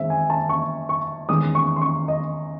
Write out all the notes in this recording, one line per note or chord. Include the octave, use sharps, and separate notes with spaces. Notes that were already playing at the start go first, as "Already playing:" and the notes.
Already playing: F#2 D#3 G#3 C4 E5
G#5
A5
C#6
C#6
E2 D#3 G#3 C#4 D#6
C#6
C6
C#6
D#5